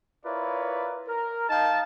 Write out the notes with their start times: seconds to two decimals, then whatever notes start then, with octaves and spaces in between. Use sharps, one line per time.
0.24 E4 F4 A#4 B4 C#5 D5
1.06 A#4
1.48 D#4 D#5 F5 G5 A5